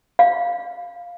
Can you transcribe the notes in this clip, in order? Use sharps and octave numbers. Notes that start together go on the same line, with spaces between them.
F5